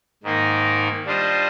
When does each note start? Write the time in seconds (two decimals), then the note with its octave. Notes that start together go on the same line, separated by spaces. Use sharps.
0.23 G#2 D#3 A#3 D#4 A#4
1.05 G3 D4 F4 C5 D#5